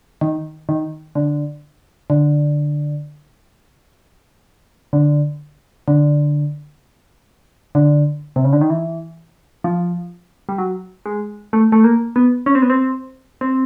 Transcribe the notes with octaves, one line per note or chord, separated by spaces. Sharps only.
D#3
D#3
D3
D3
D3
D3
D3
C3
C#3
D3
D#3
E3
F3
G3
F#3
G#3
A3
A3
A#3
B3
C#4
C4
B3
C4
C4